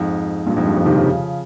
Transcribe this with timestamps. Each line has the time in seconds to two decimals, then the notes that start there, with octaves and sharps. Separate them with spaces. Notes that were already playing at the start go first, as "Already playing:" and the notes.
Already playing: F2 G#2
0.46 G2 A#2
0.56 F2 G#2
0.66 G2
0.76 F2
0.86 C3 D#3
0.96 C#3 F3